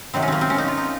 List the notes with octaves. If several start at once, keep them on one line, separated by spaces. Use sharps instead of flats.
C3 D#3 F#3 C4
C#4
A#3 C4
C4
C#4
D#4
F4
D#4